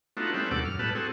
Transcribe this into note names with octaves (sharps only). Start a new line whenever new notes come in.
A3 B3 D4 D#4 F4 F#4
G3 A3 C4 C#4 E4 B4
D#2 B2 G3 A4 F#5 D6
F#2 F6
A2 G3 B3 B4 A5
C4 F#4 G#4 A4